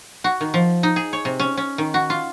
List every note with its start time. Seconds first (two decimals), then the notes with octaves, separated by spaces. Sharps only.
0.24 F#4
0.41 D#3
0.54 F3
0.83 D#4
0.96 G#4
1.13 C#5
1.25 C3
1.39 C#4
1.57 C#4
1.78 D#3
1.94 F#4
2.10 F4